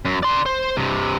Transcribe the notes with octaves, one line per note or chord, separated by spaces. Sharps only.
F#2
D5 C6
C5
G2 C3